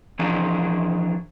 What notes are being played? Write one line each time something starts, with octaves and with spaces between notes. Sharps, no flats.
E3 F3 C#4 D4 G#4 A#4